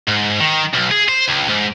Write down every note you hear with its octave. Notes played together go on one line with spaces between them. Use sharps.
G#2
D#3
B1
G#4
C5
C#2
G#2